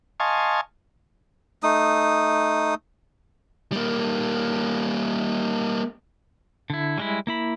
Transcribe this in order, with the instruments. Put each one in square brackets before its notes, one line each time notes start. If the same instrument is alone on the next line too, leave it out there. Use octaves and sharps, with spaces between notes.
[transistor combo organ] D#5 F5 G#5 A5 C6 C#6
[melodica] A3 D#4 D#6
[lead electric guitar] G3 A#3
[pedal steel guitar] D3 E4
G3 G#3 E4
A#3 E4 B5